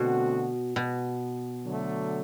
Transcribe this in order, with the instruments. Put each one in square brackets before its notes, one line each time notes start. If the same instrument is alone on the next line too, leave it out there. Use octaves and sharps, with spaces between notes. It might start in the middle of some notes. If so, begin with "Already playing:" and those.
Already playing: [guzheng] B2 [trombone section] D3 A3 C4 F#4
[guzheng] B2
[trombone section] D3 F#3 A3